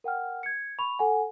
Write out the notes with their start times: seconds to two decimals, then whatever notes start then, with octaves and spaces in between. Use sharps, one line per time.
0.04 A#4 F#5 G5 F6
0.43 G#6 C#7
0.79 B5 C#6 F7
0.99 A4 F#5 G#5